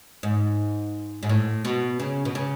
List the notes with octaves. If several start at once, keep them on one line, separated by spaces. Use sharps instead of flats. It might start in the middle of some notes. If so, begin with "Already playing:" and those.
G#2
G#2
A2
B2
C#3
B2
C#3